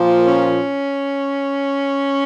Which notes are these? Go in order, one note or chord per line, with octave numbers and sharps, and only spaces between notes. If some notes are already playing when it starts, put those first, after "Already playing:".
Already playing: A#2 F3
C#4